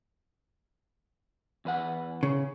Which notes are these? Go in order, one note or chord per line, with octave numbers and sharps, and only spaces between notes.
E2 B4 F#5
C#3